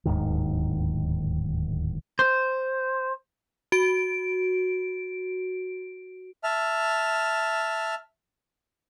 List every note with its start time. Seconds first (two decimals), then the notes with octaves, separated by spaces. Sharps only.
0.05 D1 D#2 G#2 D#3
2.19 C5
3.72 F#4 D7
6.44 E5 A5 F6